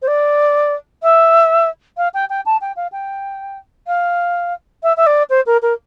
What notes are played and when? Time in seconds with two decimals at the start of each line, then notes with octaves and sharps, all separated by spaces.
0.02 C5
0.07 D5
1.02 E5
1.97 F5
2.14 G5
2.29 G5
2.45 A5
2.61 G5
2.76 F5
2.92 G5
3.87 F5
4.83 E5
4.97 E5
5.06 D5
5.29 C5
5.46 A#4
5.62 A#4